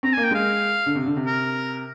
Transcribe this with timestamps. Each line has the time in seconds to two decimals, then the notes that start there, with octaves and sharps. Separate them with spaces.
0.03 C4 A#5
0.13 G#5
0.17 A#3
0.24 G5
0.31 G#3 F5
0.86 D3
0.95 C3
1.06 D3
1.17 C3
1.27 A#4